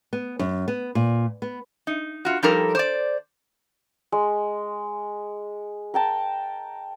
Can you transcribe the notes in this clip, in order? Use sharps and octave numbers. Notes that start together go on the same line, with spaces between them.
B3
F#2
B3
A#2
B3
D#4
F4 F#4
F3 G3 D#4 G4 A4 A#4
C5 D5
G#3
A#4 G5 A5